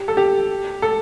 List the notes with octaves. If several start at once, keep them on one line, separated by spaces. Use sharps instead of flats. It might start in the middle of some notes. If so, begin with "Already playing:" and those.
Already playing: G4
A4
G4
A4